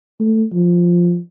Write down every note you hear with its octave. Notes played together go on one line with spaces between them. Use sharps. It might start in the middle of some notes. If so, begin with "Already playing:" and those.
A3
F3